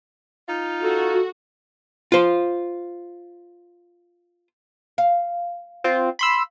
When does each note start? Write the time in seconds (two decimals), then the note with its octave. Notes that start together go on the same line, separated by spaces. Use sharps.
0.48 D#4 F4
0.82 F#4 A4
2.12 F4 C5
4.98 F5
5.84 C4 F4
6.19 B5 C6 E6